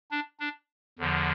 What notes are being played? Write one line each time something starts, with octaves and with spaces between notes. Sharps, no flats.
D4
D4
E2 D3 F3